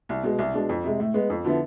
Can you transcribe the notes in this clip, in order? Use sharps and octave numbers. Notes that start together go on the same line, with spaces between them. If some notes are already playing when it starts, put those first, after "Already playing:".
C2
B2 G#3
C2
B2 G#3 D4
F2
C3 G#3
A2
G#3 B3
F2
D3 F3 B3 E4